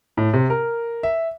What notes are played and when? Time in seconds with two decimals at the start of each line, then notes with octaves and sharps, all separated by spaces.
0.17 A2
0.33 C3
0.50 A#4
1.03 E5